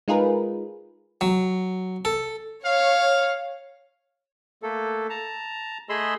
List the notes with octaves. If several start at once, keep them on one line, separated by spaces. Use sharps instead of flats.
G#3 D#4 F4 G#4 A#4 B4
F#3
A4
C#5 F5
A3 A#3 A4
A5 A#5
A3 G#4 D#5 B5 C6 E6